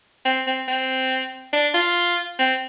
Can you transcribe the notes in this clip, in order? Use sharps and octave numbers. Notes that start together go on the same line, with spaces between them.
C4
C4
C4
D4
F4
C4